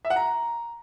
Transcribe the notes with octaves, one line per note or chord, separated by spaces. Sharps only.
E5
F#5
A#5